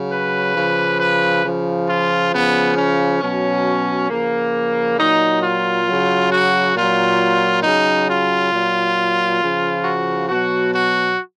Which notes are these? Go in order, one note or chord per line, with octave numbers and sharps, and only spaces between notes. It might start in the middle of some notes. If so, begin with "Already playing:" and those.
Already playing: C#3 F#3
B4
C#3 F3
B4
C#3 F3
F4
C#3 F3 B3
C#4
B2 F#3 C#4
C#3 F3 A#3
A#2 F#3 D#4
F4
C#3 F#3
F#4
A#2 F#3 F4
C#3 F#3 D#4
F4
A#2 F#3
C#3 F3
F#4
B2 F#3 F#4
F#4